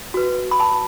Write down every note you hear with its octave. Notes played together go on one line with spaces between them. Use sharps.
F#4 B4
B5
A5